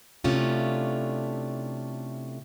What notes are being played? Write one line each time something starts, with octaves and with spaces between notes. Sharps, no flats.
C3 A3 C#4 D4 E4 F4